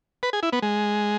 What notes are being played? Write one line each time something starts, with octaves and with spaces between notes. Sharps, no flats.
B4
G#4
E4
B3
G#3